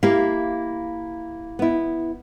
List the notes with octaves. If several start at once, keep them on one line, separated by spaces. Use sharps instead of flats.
A#3 E4 G4 E5 F5
B3 E4